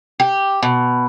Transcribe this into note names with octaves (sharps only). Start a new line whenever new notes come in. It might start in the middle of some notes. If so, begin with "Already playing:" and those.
G4
B2